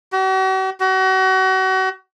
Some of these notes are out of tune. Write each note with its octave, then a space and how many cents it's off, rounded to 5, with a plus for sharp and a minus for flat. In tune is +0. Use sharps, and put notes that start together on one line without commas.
F#4 +45
F#4 +35